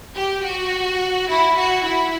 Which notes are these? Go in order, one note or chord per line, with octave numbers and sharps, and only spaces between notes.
G4
F#4
E4
F#4
E4